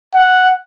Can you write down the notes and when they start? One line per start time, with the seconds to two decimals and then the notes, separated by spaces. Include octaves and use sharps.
0.14 F#5